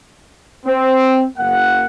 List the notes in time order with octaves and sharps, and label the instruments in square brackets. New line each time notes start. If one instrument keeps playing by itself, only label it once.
[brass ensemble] C4
F#1 A#3 F#5